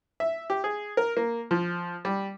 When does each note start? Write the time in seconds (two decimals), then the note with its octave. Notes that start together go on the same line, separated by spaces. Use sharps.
0.20 E5
0.50 G4
0.64 G#4
0.97 A#4
1.17 A#3
1.51 F3
2.05 G3